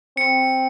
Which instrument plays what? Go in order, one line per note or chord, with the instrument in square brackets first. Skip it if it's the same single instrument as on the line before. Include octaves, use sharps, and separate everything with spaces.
[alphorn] C4 [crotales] C#7